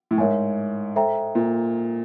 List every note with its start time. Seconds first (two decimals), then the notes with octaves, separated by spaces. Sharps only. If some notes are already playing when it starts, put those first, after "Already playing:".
0.11 A2
0.18 G#2 A#4 C#5 E5 G#5
0.96 A4 C5 E5 G5 A#5
1.35 A#2